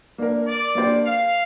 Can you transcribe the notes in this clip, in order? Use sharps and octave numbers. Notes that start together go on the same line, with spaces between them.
A#3 D4 A#4
D5
A#3 D4 G4 C5
F5